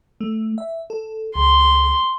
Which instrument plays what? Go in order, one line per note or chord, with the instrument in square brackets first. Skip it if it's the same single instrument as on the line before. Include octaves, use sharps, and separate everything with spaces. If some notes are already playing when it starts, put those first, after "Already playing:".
[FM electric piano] A3
E5
A4
[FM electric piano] C#2 [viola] C6